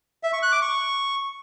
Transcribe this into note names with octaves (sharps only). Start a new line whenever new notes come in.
E5
C#6
F#6
D6
C#6